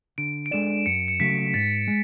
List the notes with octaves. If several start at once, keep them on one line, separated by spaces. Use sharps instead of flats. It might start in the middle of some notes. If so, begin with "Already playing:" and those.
D3 D7
D7
G#3 D4 A4 D5 E7
F#2 C#7
C#7
C#3 F#3 A3 B6
G#2 A6
G#3